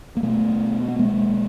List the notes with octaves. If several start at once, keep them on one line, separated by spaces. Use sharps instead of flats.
A#3
B2 A3 B3
B3
G#3 A#3